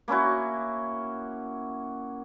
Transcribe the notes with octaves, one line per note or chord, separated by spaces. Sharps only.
A#3 C#4 E4 F#4